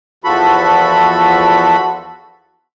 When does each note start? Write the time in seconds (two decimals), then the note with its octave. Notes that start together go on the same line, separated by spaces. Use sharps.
0.24 E2 F3 F#4 A4 B5